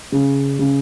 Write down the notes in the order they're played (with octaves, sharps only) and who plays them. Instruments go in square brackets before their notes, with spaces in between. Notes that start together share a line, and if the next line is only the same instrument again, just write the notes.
[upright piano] C#3
C#3